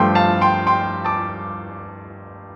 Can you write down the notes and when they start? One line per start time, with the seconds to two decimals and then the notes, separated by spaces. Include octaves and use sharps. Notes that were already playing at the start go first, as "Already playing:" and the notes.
Already playing: G2 F3 A3 G5 C6
0.15 F5 A5
0.41 G5 C6
0.67 G5 C6
1.05 A5 D6